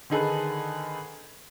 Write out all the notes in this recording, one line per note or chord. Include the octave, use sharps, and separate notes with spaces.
D3 D#3 D#4 G#4 A4 B4